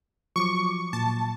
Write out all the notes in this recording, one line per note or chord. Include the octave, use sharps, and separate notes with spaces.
F3 F#3 C#6 D6
A#2 A5